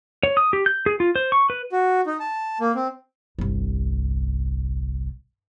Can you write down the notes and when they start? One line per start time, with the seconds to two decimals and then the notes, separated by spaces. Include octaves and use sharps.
0.23 C#5
0.37 D#6
0.53 G4
0.66 G6
0.86 G#4
1.00 F4
1.16 C5
1.32 C#6
1.50 B4
1.72 F#4
2.06 D#4
2.20 A5
2.61 A#3
2.75 C4
3.39 G1 C2